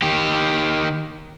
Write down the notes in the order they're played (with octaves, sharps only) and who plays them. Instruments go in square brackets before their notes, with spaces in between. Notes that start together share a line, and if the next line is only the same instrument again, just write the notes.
[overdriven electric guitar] D#3 G4